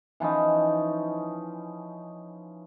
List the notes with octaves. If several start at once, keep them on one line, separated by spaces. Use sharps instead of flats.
E3 F3 C#4 D#4